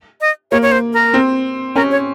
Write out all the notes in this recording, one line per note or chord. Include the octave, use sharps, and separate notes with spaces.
D#5
A#3 C#5
C#5
C5
A#4
C4
C#4 A#4
C#5